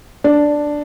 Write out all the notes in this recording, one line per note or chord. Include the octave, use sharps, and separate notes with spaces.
D4